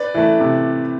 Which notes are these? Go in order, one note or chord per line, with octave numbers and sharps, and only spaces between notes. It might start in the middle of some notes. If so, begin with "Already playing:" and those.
Already playing: B4 D5
E3 A3
C3